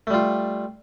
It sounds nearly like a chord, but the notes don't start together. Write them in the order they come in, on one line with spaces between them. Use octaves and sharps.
A3 G3 F4